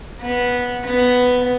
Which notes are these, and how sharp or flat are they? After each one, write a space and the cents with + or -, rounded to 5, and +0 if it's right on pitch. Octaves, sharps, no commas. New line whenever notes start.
B3 -10
B3 +5